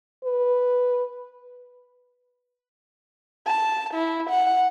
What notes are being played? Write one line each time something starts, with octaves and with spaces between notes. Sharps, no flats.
B4
A5
E4
F#5